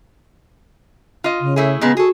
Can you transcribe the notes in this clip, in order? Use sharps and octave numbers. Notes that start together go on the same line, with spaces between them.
F4 D#5
C#3
A3 E4 G#4
A#2 C#3 G#3 B3
F#4 G#4 A4